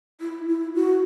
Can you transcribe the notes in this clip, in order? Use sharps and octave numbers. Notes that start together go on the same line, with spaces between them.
E4
E4
F#4